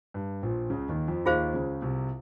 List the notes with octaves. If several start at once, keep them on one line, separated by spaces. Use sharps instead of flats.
G2
A#1 A#2
C#2 C#3
D#2 D#3
F2 F3
D#2 D#3 F4 G#4 C5 F5
C#2 C#3
C2 C3